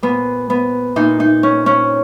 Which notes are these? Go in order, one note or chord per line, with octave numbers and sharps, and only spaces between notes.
A#2 B3
B3
A#2 D#4
D#4
C#4
C#4